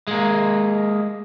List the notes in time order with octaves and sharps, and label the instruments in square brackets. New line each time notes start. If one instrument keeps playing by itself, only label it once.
[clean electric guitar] G#3 A#3